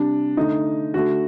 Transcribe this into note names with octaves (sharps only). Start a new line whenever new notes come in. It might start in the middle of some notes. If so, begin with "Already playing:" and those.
Already playing: C3 G3 D4
D3 A3 D#4
D3 A3 F#4